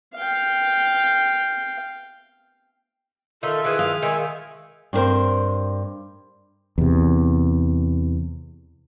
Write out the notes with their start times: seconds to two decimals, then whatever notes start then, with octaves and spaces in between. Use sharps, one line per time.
0.16 F5 G5
3.43 D#3 D#4 F4 A4 E5
3.64 D#3 E3 G#4
3.79 F5
4.03 D#3 G#3 E5 G#5
4.93 G2 C4 D4 A#4 C5
6.78 E2 C3